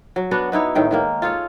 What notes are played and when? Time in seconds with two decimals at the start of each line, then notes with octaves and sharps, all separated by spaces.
0.16 F#3
0.31 B3 D4 F#4
0.52 B3 D#4 E4 C#5
0.75 A2 D#3 G5
0.91 D#3 G#3 A#3
1.22 F4 G#4 A4 C#5